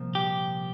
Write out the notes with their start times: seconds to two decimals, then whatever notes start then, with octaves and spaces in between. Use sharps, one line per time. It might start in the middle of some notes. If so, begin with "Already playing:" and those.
Already playing: C2 A#2 F3
0.15 G4